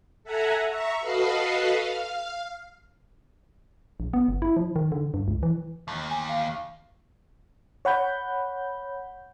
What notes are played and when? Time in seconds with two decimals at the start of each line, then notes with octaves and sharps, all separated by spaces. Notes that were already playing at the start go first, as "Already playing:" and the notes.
0.24 A4 E5 F#5 G#5 A#5
0.68 E5 A#5 C#6
1.00 F#4 A4 B4 D#5 F5 C7
1.77 F5
4.00 A#1
4.13 B3
4.28 G1
4.42 E4
4.56 F3
4.76 D#3
4.92 D3
5.14 G2
5.28 C#2
5.43 E3
5.88 D#2
6.10 G#5
6.29 F5
7.85 C#5 F#5 B5 G6